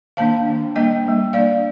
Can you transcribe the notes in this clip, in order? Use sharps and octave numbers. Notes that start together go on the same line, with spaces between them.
D#3 A#3 D4 F5 A5
D#3 A#3 D4
G3 A#3 D4 D#5 G5
G3 A#3 D4
G3 A#3 D4 D5 F5